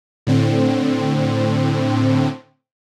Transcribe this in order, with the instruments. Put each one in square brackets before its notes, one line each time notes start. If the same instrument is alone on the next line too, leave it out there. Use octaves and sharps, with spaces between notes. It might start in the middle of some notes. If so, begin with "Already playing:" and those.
[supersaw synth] A2 D3 C4